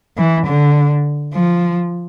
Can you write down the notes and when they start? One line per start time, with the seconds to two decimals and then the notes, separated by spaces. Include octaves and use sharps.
0.17 E3
0.47 D3
1.33 F3